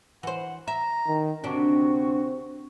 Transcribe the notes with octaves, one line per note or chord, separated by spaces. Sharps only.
E3 C5 F#5
E5 A#5
D#3
D2 C3 C4 D4 F#4